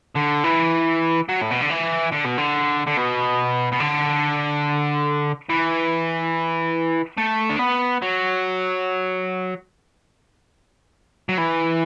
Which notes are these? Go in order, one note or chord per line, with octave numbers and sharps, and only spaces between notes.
D3
E3
F#3
A2
B2
D3
E3
D3
B2
D3
D3
B2
B2
D3
E3
A3
D4
B3
F#3
F#3
E3